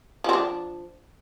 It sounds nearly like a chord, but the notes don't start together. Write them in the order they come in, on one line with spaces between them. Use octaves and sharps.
F3 C4 D4